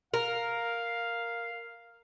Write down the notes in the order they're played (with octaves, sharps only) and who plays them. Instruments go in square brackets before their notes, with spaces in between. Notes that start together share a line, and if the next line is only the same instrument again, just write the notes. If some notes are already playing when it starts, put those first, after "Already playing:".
[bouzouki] A#4 [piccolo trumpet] F5